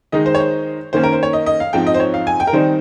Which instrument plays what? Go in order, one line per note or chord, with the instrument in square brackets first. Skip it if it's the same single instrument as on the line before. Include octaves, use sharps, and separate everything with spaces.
[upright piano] D#3 G#3 D#4 D#5
C5
C#5
C5
D#3 A#3 C#4 C5
A#4
C5
C#5
D#5
D#5
F5
G#2 F3 C4 D#4 G5
D#5
C5
C#5
F5
G#5
G5
A#4
D#3 G3 C4 D#4 C5